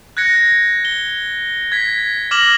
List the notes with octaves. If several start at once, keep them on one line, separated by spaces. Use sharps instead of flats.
F#6 G#6 A#6 C#7
G7
G#6 B6
D6 F6 A#6 E7 F#7